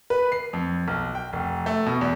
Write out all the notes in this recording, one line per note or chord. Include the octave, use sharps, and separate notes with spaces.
B4
C7
F2
B1
G5
F1
A3
B2
E2